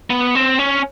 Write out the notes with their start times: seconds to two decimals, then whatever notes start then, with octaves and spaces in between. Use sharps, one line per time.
0.10 B3
0.35 C4
0.59 C#4